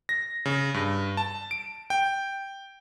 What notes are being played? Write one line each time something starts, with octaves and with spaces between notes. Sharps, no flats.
A#6
C#3
G2
A5
D7
G5